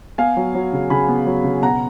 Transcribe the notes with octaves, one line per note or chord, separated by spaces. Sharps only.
B3 F5 G#5
F#3
F#3
C#3
C#3 G#5 B5
B3
F#3
C#3
B2 F#5 A#5